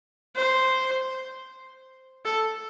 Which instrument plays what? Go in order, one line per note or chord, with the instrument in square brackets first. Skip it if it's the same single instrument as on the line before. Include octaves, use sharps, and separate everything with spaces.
[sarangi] C5
A4